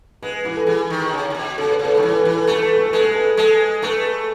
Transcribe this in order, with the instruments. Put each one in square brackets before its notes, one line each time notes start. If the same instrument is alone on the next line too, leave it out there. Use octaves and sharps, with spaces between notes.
[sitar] G#3 [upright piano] B4
[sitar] E3 [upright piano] B4
[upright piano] A4
[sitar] E3 [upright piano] G#4
[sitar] D#3
B2
C#3
C#3
B2
[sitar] C#3 [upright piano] A4
[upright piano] B4
[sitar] C#3 [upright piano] A4
[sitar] D#3 [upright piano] B4
[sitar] E3
[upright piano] A4
[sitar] E3 [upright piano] B4
[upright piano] A4
[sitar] A3 [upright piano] B4
[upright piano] A4
B4
[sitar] G#3 [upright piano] A4
[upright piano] B4
A4
[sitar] G#3 [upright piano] A4
[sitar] A3 [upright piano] B4